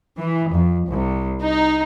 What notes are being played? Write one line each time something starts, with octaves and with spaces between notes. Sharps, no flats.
E3
F2
C2
D#4